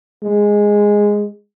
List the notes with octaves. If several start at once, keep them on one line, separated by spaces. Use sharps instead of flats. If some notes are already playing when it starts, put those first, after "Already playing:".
G#3